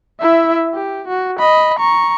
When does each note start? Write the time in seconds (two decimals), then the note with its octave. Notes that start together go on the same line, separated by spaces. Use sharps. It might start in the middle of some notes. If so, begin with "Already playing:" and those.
0.20 E4 E5
0.74 G4
1.08 F#4
1.39 D#5 B5
1.79 A#5 C#6